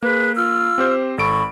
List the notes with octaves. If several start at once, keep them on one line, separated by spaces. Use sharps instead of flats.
A#3 G#4 B4 F#6
F4 E6 F6
C4 G4 C5
G#1 A4 B5 C#6 D7